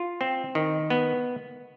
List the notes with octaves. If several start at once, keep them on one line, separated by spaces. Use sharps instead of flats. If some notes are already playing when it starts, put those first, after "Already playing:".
Already playing: F4
C4
D#3
B3